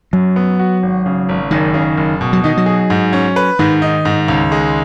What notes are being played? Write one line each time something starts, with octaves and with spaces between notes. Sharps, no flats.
F#2 F#3
B3
F#4
G#1
C#3
G#1
F#1 D#3
C#3
F#1
B2
F#3
D#3 D#4
F#3
G#4
G#2
C#4
B4
G#2 D#3
D#4
G#2
C#2
G#3